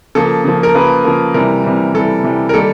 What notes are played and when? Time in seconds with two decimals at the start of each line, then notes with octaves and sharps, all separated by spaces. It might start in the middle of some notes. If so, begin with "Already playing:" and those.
0.15 C#3 F3 A#3 A4
0.45 C#3 F3 A#3
0.63 A#4
0.75 C#3 F3 A#3 B4
1.04 C#3 F3 A#3
1.34 C3 E3 G3 A#4
1.64 C3 E3 G3
1.94 C3 E3 G3 A4
2.24 C3 E3 G3
2.49 A#4
2.54 D#3 G3 A#3 A4